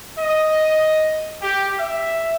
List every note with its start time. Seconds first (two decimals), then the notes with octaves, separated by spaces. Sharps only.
0.17 D#5
1.42 G4
1.78 E5